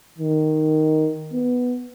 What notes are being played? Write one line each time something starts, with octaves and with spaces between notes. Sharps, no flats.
D#3
B3